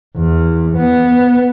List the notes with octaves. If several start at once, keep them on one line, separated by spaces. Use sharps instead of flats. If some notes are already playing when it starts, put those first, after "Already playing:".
E2
B3